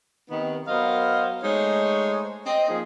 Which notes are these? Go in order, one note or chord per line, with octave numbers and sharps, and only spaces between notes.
C3 D#3 B3
F#3 B3 A#4 C5 D#5 F5
G#3 A3 D#4 C5 C#5
C4 D#5
F3 A#3 D#4 G#4